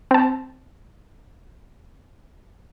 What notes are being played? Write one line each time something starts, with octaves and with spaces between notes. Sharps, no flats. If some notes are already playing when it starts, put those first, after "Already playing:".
C4 A5